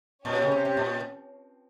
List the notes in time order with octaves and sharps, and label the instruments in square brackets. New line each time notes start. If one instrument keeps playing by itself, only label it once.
[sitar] A#2 [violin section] C#4 G4 C#5
[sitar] C#3
C3
C3
A#2